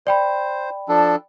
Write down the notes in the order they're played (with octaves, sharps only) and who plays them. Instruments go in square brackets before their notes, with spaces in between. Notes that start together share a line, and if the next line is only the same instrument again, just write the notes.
[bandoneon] C5 [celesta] D5 G5 B5
[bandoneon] F3 D4 A4